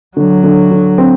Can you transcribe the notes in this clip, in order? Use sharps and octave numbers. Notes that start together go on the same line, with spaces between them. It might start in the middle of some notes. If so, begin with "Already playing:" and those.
D3 F#3
D3
D3
C4